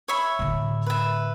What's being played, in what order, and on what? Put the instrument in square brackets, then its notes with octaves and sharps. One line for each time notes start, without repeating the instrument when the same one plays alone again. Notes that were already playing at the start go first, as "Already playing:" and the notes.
[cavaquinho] C#5 E5 B5
[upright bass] A2 D3
[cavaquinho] B4 E5